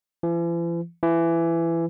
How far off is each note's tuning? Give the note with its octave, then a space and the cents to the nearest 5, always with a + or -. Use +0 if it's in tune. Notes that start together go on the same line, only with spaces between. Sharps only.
E3 +45
E3 +20